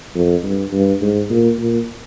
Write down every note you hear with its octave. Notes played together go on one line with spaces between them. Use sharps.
F2
G2
G2
G#2
A#2
A#2